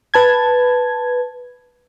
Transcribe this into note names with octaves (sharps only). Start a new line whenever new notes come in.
B4 A5 G#6